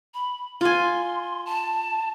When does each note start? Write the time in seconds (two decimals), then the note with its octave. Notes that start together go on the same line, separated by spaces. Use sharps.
0.14 B5
0.61 F4 G#5 C6
1.46 A5